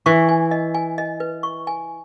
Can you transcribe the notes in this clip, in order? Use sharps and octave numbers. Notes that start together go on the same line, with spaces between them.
E3 C#6
G#5
D#5
G#5
D#5
B4
C#6
G#5